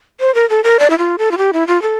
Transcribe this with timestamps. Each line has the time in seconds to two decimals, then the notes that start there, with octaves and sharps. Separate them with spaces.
0.20 C5
0.35 A#4
0.50 A4
0.64 A#4
0.79 D5
0.90 E4
0.98 F4
1.18 A4
1.31 F4
1.38 G4
1.53 E4
1.67 F4
1.82 A4